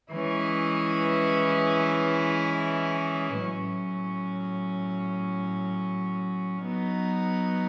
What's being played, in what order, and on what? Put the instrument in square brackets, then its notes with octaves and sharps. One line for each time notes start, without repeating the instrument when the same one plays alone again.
[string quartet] E3 G#3 C#4 E4
A2 F#3 C#4
F#3 B3 D#4